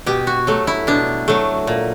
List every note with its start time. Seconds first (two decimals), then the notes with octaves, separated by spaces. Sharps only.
0.06 B2 G4
0.27 F#4
0.47 F#3 A3
0.67 E4
0.87 B2 D4
1.28 F#3 A3
1.67 A#2